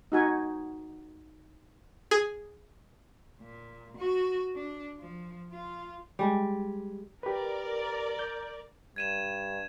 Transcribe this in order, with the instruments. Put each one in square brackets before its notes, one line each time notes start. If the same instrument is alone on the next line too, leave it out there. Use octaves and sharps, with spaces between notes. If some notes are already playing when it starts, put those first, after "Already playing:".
[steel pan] D#4 F#4 G#5
[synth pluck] G#4
[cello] A#2
F#4
D4
F3
F4
[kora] G3 G#3
[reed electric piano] G4 B4 [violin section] A#4 D5
[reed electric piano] G6
[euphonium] G2 [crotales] G#6 D#7 E7